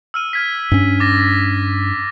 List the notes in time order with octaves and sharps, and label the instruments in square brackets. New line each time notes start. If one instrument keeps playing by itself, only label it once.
[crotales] E6 F6 D#7
F6 G#6 B6
[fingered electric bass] G2 C#4
[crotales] D6 A6 A#6